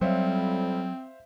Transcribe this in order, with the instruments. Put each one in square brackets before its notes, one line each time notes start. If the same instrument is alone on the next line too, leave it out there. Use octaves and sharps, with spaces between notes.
[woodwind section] F2 G3 [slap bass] F#3 [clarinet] C4 [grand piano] C5 E5 F5